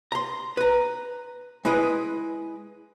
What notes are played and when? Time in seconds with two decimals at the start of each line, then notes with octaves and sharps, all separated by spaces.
0.12 A#5 C6
0.57 B4 A#5
1.65 G#3 E4 B4 D#5